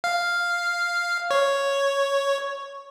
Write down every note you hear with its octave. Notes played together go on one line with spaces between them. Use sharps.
F5
C#5